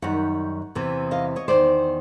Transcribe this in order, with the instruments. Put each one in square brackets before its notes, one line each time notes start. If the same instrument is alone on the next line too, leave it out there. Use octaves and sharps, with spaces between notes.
[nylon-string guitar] F#2 D#3 G3 F#5
E2 C3 E3
D#5 F5
C#5 D#5
E2 C3 D#3 C5 D5